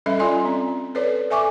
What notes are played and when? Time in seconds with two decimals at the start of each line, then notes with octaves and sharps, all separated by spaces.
0.06 G3 C#4 A4 D#5 E5
0.19 F4 D5 D#5 G#5 C6
0.45 C4
0.95 A4 B4 C#5 D5
1.30 A4 E5 G#5 C#6 D6